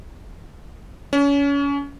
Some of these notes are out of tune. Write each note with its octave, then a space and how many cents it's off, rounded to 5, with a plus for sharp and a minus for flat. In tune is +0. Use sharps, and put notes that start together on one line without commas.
C#4 +30